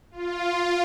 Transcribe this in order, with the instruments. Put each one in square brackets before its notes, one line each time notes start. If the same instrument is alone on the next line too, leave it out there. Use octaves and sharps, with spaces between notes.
[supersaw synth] F4